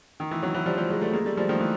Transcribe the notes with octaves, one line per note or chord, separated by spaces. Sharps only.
D#3
E3
E3 F#3
E3 F#3
F3 G3
F3 G3
F#3 G#3
G3 A3
G#3 A#3
G3 A3
F3 G3
D#3 F3
E3